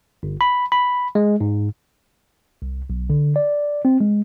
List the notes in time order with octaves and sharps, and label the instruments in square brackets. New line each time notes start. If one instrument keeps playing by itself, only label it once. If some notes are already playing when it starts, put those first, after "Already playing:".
[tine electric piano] G1
B5
B5
G#3
G#2
C2
B1
D3
D5
C4
G#3